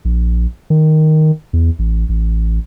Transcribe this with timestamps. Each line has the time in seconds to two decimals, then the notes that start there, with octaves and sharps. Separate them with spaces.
0.05 A#1
0.70 D#3
1.53 E2
1.79 A1
2.09 A1